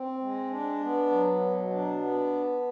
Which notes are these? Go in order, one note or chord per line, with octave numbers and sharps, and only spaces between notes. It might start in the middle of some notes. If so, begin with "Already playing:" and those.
Already playing: C4
G#3
D4
B3
F#3
B2
D4
B3